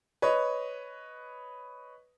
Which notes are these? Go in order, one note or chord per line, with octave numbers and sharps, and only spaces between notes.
B4 C#5 D#5